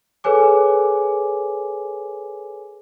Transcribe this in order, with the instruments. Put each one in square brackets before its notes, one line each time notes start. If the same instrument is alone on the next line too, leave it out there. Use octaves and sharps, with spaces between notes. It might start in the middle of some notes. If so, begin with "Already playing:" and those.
[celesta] G#4 A4 B4 C#5 G#5 D6